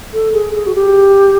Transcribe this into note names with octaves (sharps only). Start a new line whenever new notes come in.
A4
G#4
G#4
F#4
G4